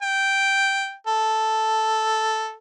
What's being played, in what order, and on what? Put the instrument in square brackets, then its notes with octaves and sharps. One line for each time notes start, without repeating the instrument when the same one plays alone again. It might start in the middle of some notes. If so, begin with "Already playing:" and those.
[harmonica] G5
A4